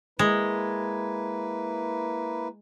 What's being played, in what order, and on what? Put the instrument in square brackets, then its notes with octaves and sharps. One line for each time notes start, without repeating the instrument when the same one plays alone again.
[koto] G#3 [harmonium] A#3 E4 B4